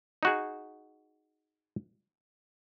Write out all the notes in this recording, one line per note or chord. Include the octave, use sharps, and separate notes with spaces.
D#4 F#4 G#4